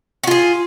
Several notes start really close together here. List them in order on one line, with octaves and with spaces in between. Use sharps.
F#4 F4 G#4